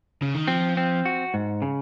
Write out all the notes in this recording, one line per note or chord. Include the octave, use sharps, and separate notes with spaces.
C#3
D#3
F3 C4
C4
F#4
G#2
C#3